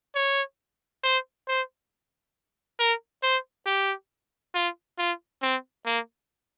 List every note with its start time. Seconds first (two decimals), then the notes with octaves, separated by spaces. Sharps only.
0.15 C#5
1.04 C5
1.48 C5
2.79 A#4
3.23 C5
3.66 G4
4.55 F4
4.98 F4
5.42 C4
5.86 A#3